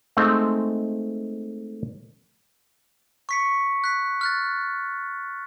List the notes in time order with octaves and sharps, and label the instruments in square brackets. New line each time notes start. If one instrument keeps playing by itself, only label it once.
[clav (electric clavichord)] G#3 A3 C4 D#4
[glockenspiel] C#6 B6 C#7
F#6 B6
F6 F#6 A6